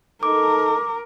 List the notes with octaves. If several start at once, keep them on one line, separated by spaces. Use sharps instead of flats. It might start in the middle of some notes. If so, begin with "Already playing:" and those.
D#4 A4 A#4 D6